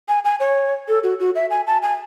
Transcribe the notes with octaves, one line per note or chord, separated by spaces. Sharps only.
G#5
G#5
C#5
A4
F#4
F#4
E5
G#5
A5
G#5